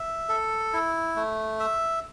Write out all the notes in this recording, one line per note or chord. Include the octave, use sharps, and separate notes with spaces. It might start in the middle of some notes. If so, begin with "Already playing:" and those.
Already playing: E5
A4
E4
A3
E5